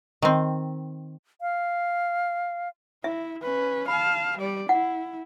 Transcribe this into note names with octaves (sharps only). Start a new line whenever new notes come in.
D#3 C4
F5
E4 E5
C#4 B4
F5 A5 B5
G3 D5
E4 F#5